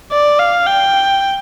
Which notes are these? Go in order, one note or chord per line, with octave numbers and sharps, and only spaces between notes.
D5
F5
G5